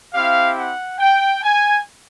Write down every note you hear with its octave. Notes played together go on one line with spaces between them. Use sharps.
C4 E4 G4 F5
F#5
G5
G#5